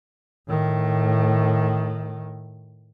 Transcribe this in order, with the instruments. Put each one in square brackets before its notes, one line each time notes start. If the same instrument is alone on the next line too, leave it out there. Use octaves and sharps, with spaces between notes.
[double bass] A2 D#3